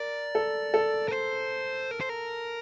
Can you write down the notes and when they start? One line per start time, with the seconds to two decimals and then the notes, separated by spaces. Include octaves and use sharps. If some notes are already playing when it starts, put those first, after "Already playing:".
Already playing: A#4 D5
0.35 A4
0.74 A4
1.08 A#4
1.12 C5
1.91 A#4
2.01 C5
2.09 A#4